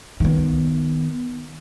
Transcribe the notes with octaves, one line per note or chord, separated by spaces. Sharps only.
D#3 B3